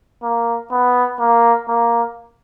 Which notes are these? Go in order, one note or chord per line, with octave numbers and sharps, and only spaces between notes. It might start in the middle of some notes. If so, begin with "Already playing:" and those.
A#3
B3
A#3
A#3